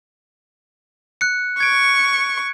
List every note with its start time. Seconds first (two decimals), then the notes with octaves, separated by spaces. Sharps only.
1.21 F#6 C#7
1.60 C#6 G#6 D7